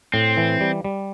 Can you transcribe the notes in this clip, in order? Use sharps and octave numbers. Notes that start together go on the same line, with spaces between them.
A2 C4
E3
G3
G3